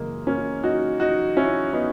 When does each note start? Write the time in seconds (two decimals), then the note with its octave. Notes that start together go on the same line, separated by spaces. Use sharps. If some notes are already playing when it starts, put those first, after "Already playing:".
Already playing: F#2 C#3 E3 G#3 A#3
0.27 A#3 C#4
0.63 D#4 F#4
1.00 D#4 F#4
1.36 C#4 E4
1.73 B3 D#4